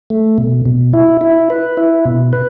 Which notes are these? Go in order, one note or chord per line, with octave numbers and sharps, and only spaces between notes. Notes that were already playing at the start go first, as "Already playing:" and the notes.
A3
B2
B2
E4
E4
B4
E4
B2
B4